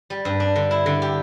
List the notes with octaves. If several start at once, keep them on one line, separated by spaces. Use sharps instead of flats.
G3
G2
D4
D3
E4
D3
G4